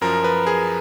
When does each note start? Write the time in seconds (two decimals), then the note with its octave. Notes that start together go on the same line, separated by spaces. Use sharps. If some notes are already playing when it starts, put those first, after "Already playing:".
0.01 F#2 F3 A#4
0.24 B4
0.47 G#4